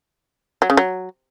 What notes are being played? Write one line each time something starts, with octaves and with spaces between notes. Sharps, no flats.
F#3
C#3
F#3